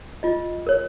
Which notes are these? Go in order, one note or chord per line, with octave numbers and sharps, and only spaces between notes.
F4 D#5
A#4 C#5